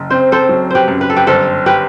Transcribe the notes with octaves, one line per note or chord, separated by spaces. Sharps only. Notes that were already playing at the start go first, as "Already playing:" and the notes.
Already playing: F#1
C4 C5
A4 C5
F#3
G4 B4 C5
F#2
B4
A4
G4 B4
G1 A4 C5
G4 B4